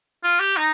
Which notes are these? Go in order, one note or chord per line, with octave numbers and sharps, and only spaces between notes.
F4
G4
D#4